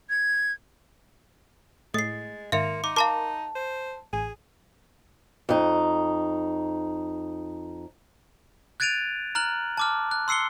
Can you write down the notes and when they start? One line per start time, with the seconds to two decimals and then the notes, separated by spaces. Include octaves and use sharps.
0.10 G#6
1.94 A2 G#3 D#6 A6 C7
2.52 G#2 D#3 A#3 E5 F5 C6 C#7 F7
2.84 D#4 D6
2.96 A#4 F5 A5 A#5 C6 D6
3.55 C5
4.13 A1 G#4 G#5
5.49 F2 D#4
8.80 F#6 G#6 A6 D7 D#7 F7
9.35 A#5 F6 F#6 F#7
9.78 A5 D6 F6
10.11 F#6
10.28 C6 E6 C7 C#7 G7